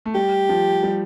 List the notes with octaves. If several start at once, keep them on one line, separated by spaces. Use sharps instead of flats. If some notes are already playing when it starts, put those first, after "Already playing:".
A3
G3 G4
F3
G3